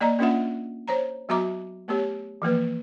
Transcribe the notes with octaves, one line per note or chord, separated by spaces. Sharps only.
A#3 D5 D#5 A#5
A#3 C#4 D4 F4 E5 F#5
C5 C#5 A#5
F#3 B3 F#4 E5 A#5 D6
A3 B3 G4 C#5
E3 F3 A#3 B4